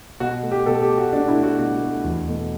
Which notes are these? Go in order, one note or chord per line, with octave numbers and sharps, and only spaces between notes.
B2 F#4
A3
G4
B2 A4
G4
A3
F#4
B2 D4
E4
A3
F#4
B2 F#4
A3
E2
B2 A3